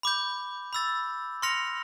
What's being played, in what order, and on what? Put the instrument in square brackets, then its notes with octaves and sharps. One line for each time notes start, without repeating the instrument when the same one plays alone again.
[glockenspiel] B5 D6 G6
B5 E6 A6
C6 F6 A#6 C#7 F7